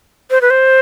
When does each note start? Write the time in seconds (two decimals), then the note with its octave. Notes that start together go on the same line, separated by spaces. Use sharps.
0.31 C5
0.41 B4
0.50 C5